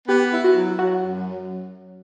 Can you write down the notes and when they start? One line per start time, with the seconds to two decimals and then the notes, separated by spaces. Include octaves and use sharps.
0.08 B3 G4
0.32 E4
0.44 F#4
0.56 F#3
0.79 F#3 F#4
1.03 F#2
1.26 F#3